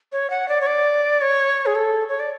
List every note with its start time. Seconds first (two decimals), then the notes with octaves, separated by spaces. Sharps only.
0.12 C#5
0.30 F#5
0.48 D5
0.61 C#5
0.67 D5
1.21 C#5
1.66 G#4
1.75 A4
2.09 C#5
2.20 D5